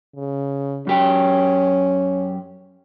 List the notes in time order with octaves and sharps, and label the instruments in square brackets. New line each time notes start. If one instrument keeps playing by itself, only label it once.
[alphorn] C#3
[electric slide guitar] F#2 G4 [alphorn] C#4